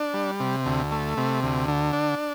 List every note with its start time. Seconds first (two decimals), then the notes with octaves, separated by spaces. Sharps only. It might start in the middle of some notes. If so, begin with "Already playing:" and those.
Already playing: D4
0.14 G3
0.40 C3
0.66 D2
0.92 A3
1.17 C3
1.43 D2
1.68 D3
1.93 D4